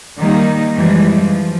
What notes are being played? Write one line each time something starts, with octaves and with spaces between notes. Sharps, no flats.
D#3 G3 A#3 D#4
F#2 E3 F3 G3 G#3
F3